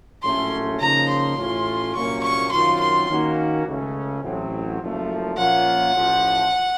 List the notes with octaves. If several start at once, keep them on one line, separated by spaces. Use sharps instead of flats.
A#1 A2 F#3 A3 C#4 C6
C#3 F3 A#3 D#4 A#5
C6
A1 A2 A3 C#4 F4
C2 A#2 F#3 A#3 C#4 C#6
C#6
F#2 D#3 F#3 C4 F4 C6
C6
D#3 A#3 C#4 F#4
C#2 C#3 A3 C#4
A1 A2 F#3 C4
F#1 F#2 F3 A3
A#2 F3 A#3 C#4 F4 F#5
A1 A2 F3